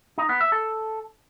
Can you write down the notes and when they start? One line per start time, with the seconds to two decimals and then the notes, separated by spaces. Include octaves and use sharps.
0.18 D#4
0.29 B3
0.41 E5
0.52 A4